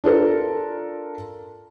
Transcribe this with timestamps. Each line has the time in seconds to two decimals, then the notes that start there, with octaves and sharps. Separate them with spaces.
0.04 D4 F4 A4 A#4